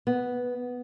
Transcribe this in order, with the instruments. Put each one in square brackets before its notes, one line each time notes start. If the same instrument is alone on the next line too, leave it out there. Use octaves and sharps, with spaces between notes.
[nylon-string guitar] B3